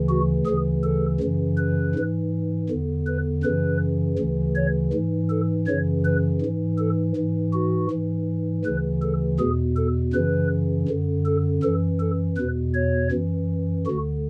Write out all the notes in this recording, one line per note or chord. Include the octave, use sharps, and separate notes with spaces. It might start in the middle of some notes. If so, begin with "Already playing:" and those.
Already playing: D2 C#3 E3
F#4
D2 C#3 E3 G#4
A4
F#2 C#3 E3
B4
G#2 E3
E2 D3
B4
F#2 C#3 E3 B4
D2 C#3 E3
C#5
G#2 E3
A4
F#2 C#3 E3 C#5
B4
G#2 E3
A4
G#2 E3
F#4
G#2 E3
D2 C#3 E3 B4
A4
E2 B2 G#4
A4
F#2 C#3 E3 B4
F#2 D3
A4
F#2 E3 A4
A4
E2 B2 B4
C#5
F#2 E3
D2 D3 F#4